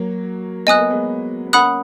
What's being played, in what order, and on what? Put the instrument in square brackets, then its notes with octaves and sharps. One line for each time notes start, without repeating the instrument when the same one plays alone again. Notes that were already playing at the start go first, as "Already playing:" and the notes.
Already playing: [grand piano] F#3 A#3
[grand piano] B3 [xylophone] D#5 G#5 D#6 F#6
[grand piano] A#3
G#3 B3
B3
[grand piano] A#3 C#4 [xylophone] F#5 B5 D#6 F#6